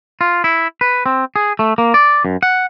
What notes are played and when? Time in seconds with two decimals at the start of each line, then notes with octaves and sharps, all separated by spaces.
0.21 F4
0.44 E4
0.81 B4
1.06 C4
1.36 G#4
1.59 A3
1.78 A#3
1.94 D5
2.25 F#2
2.43 F#5